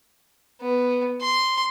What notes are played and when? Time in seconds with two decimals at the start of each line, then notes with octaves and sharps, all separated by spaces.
0.61 B3
1.21 C6